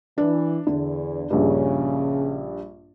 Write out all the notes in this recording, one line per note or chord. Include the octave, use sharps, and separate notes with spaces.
E3 D4
E2 D3
A#1 G2 C#3